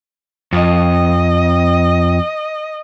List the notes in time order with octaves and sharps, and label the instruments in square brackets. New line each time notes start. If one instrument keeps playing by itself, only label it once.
[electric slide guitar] F2 [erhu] D#5